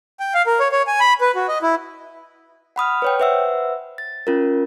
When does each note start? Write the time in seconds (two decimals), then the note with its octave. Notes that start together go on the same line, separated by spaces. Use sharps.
0.20 G5
0.34 F5
0.46 A#4
0.60 C#5
0.72 C#5
0.87 G#5
1.00 B5
1.21 B4
1.35 F#4
1.48 D#5
1.62 E4
2.76 F#5 B5 D#6 F6
3.02 B4 C#5 G5
3.20 B4 C5 E5 F#5 E6
3.98 A6
4.27 C#4 F4 A#4